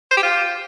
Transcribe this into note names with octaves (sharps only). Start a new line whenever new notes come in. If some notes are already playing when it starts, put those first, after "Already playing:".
C5
G4
F4